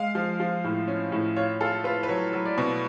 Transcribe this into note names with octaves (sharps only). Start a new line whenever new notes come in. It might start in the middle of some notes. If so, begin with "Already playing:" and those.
Already playing: G#3 F5
F3
F3
A2
C#4
A2
F4 C#5
F4 A4
F4 B4
B4
F#3 C#5
F#3
D5
B2